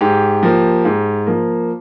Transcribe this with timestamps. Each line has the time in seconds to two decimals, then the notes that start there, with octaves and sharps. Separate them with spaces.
0.01 G#2 G4
0.43 F3 A#3
0.85 G#2
1.27 F3 A#3